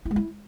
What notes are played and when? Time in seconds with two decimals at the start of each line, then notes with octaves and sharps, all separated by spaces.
0.05 E4
0.11 G#3
0.16 E4